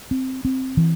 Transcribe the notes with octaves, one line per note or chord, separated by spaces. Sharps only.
C4
C4
E3